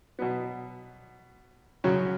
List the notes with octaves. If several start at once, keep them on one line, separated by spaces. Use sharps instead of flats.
B2 F#3 B3
F#2 C#3 F#3 C#4 F#4